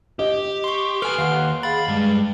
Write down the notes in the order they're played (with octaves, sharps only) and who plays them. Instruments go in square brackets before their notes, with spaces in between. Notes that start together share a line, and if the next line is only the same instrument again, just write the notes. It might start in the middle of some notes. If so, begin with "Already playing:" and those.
[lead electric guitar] G4 [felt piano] D#5
[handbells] C6 C#6
[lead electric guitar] A4 G#5 [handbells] B4 F6 D7
[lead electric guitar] D#2 [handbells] F5 C6 [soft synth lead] F#5
[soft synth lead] G#4 [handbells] F5 A6 [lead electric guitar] B5
[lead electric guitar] G2 [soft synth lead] G#3